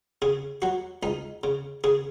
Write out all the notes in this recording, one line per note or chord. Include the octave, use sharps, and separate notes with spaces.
C#3 G#4
F#3 F#4
C#2 D#4
C#3
C#3 G#4